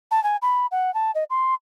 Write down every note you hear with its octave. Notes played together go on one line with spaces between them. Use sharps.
A5
G#5
B5
F#5
A5
D#5
C6